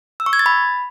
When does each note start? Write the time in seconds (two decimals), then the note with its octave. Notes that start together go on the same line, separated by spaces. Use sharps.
0.20 E6
0.26 C#6
0.33 G#6
0.39 A6
0.46 B5